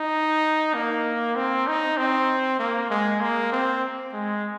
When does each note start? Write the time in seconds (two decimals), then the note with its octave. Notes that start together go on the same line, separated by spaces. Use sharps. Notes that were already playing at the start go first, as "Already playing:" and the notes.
Already playing: D#4
0.75 A#3
1.36 C4
1.68 D#4
1.97 C4
2.59 A#3
2.91 G#3
3.21 A#3
3.52 C4
4.13 G#3